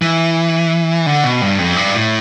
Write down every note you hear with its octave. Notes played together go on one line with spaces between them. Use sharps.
E3
D3
B2
G2
F2
G2
A2